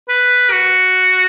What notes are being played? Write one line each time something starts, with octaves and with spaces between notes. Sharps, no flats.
B4
F#4